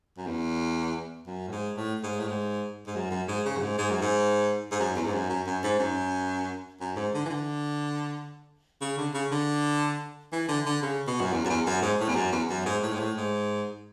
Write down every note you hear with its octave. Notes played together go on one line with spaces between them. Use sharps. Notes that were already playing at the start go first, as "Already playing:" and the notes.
F#2
E2
F#2
A2
G#2
A2
G#2
A2
G#2
G#2
F#2
F#2
G#2
C#3
F#2
G#2
G#2
F#2
G#2
G#2
F#2
E2
G#2
F#2
F#2
F#2
G#2
F#2
F#2
G#2
D3
E3
D3
C#3
D3
C#3
D3
E3
D3
D3
C#3
B2
F#2
E2
F#2
E2
F#2
G#2
A2
E2
F#2
E2
F#2
G#2
A2
G#2
A2
G#2